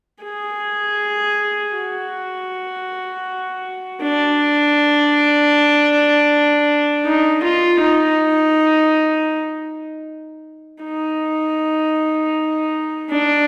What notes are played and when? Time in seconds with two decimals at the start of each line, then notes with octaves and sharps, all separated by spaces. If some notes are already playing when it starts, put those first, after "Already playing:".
0.24 G#4
1.76 F#4
4.02 D4
7.05 D#4
7.43 F4
7.80 D#4
10.84 D#4
13.10 D4